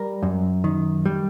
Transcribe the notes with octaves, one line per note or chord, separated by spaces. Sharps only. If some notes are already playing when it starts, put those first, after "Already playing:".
Already playing: G3 A#4
F#2
D#3
G3